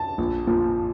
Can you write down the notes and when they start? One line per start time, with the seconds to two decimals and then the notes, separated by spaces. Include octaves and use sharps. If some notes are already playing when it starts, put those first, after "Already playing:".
Already playing: A5
0.18 A#1
0.47 A#2 F3